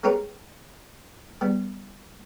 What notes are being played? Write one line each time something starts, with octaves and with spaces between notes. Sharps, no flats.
G#3 C#4 D#4 G4 A#4 B4
G3 B3